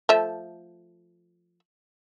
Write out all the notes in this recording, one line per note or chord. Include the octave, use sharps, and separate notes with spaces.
F3 A3 E5